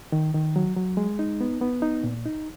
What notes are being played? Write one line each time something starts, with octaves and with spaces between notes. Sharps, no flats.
D#3
D#3
F#3
F#3
G#3
D#4
B3
B3
D#4
A#2
D#4